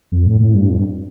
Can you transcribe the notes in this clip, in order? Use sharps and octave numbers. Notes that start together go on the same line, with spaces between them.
F2
A2
A2
G2
F2
G2